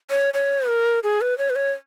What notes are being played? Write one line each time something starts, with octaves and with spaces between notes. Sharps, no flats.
C#5
C#5
A#4
G#4
B4
C#5
B4
C#5